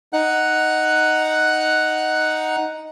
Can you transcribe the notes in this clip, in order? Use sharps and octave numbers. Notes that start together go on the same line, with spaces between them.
D#4 F#5 F#6